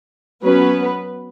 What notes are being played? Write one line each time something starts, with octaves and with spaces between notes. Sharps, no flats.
F#3 B3 C#4 B4